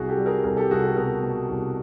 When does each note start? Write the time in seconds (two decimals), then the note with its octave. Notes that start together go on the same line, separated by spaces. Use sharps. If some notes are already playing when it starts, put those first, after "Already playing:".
Already playing: C2 F#4 G#4
0.09 G4 A4
0.17 G3
0.26 G#4 A#4
0.43 C2 G#4 A#4
0.57 G4 A4
0.71 C2 F#4 G#4
0.83 G4 A4
0.96 B2 G#4 A#4
1.23 B2
1.49 C2